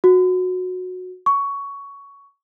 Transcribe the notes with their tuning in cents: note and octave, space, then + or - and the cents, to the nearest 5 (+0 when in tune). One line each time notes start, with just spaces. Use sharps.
F#4 -15
C#6 +15